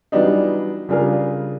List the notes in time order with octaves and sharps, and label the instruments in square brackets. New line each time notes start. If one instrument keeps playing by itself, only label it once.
[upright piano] E3 F#3 G3 B3 D4 D#4
C#3 G3 D4 F4 G#4 A#4